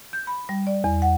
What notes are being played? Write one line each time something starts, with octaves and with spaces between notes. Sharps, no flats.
G6
B5
G3
D5
E2
F#5